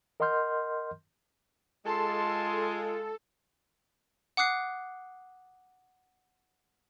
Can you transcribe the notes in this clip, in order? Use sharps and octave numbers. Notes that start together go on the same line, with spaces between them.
A#4 D#5 F#5 C6 F6 G6
G#3 F4 A4 A5 C6
F#5 D6 D#6 F#6 C7